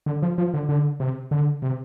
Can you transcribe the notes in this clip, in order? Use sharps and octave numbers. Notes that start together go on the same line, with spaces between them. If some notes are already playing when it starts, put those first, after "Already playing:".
D3
F3
F3
D3
D3
C3
D3
C3